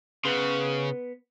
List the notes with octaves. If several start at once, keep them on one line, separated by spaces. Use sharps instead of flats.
C#3 B3 B4 C6